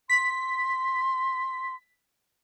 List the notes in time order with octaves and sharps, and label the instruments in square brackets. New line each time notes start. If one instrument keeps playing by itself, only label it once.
[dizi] C6 [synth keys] B6